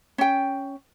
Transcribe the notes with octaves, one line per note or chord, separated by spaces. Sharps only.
C#4 G5